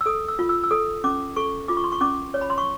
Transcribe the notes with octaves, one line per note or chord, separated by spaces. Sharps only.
E6
A4 D#6
E6
F4
E6
E6
A4 D#6
C#4 D6
A4 C#6
F4 D6
C#6
C6
C#6
C#4 D6
C#5
B5
C6
C#6